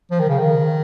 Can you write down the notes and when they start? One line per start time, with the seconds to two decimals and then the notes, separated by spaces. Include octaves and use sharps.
0.11 F3
0.20 D#3
0.29 C#3
0.38 D#3